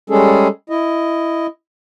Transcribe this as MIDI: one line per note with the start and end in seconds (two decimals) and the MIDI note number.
0.10 0.48 55
0.10 0.48 56
0.10 0.48 61
0.10 0.48 68
0.10 0.48 69
0.70 1.47 64
0.70 1.47 75